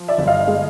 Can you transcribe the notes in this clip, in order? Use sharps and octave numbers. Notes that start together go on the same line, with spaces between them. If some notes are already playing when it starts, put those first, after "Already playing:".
Already playing: F3
D5 E5
G1
D#5 F5
G#3